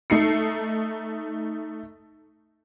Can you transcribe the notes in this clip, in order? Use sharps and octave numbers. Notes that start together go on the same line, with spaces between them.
A3 D#4 C7 C#7